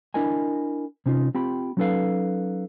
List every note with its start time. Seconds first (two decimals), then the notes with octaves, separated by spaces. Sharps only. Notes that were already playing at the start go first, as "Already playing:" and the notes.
0.14 D4 E4 A#4 D#5 G#5
1.06 C3 C#4 D#4 F4
1.35 C4 F4 G4 G5 B5
1.77 F#3 C#4 D#4 A4 B4 F5